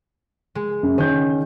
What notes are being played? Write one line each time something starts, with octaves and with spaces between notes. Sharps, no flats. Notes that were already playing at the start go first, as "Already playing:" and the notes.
G#3
F#2
D#3 C#4 G6